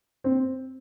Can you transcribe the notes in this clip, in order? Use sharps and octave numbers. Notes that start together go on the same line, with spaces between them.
C4